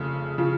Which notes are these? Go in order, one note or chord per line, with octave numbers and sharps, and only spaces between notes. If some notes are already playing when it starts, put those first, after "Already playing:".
Already playing: F1 F2 C#3 F3
C#3 F3